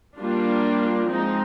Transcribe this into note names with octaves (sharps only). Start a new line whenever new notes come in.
G3 A#3 D4 F4
F3 G#3 C4 D#4